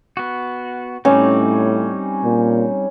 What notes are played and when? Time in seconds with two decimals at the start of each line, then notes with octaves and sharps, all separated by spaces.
0.17 B3 F#4
1.05 A2 G3 C4 C#4 D#4
2.25 A#2